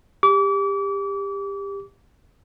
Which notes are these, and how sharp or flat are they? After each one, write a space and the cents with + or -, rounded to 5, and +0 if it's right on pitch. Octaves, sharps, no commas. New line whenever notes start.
G4 +25 D6 -35